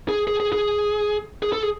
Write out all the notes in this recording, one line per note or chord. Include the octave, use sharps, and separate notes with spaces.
G#4
G#4
G#4
G#4
G#4
A4
G#4